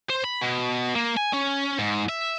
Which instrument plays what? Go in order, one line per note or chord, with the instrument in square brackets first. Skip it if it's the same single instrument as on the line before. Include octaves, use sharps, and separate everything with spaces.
[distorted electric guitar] C5
B5
B2
A#3
G#5
C#4
G#2
E5